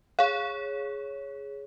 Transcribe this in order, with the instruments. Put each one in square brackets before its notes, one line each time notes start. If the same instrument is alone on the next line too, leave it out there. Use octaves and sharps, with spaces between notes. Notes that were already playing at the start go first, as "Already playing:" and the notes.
[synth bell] G#4 C#5 [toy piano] F5